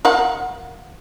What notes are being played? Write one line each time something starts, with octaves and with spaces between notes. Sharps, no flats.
A#4 F5 F#5